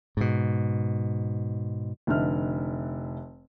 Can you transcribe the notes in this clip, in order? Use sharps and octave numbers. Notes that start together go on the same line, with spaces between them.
G#2 B2
F1 D3 D#4 E5 F6